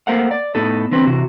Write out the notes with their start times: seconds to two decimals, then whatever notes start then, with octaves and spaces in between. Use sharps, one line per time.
0.07 A3 A#3 A#4 C5 F5 F#5
0.31 D5
0.55 A2 A3 B3 D#4 A4
0.91 D3 E3 C4 B4
1.06 C3 E3 F#4